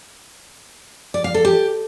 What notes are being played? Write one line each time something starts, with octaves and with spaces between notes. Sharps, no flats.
D5
F5
A4
G4